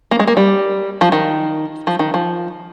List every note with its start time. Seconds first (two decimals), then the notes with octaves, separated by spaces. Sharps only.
0.11 A#3
0.19 G#3
0.27 A#3
0.37 G3
1.01 F3
1.12 D#3
1.87 F3
1.99 D#3
2.14 F3